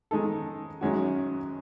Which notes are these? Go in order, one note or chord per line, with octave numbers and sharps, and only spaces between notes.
D#3 G#3 D#4 A4
F#2 D#3 G#3 C#4 F#4